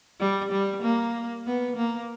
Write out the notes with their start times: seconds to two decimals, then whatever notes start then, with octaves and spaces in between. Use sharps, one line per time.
0.20 G3
0.52 G3
0.83 A#3
1.46 B3
1.76 A#3